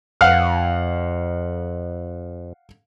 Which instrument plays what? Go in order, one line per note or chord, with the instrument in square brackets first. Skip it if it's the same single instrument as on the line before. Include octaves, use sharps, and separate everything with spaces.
[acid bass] F2 [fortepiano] F5 F#5 F6